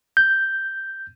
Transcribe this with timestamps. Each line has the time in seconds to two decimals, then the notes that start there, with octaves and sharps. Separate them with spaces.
0.17 G6